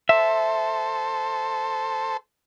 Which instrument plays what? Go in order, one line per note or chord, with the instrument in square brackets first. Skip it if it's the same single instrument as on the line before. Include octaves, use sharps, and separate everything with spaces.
[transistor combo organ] A4 C5 [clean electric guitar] E5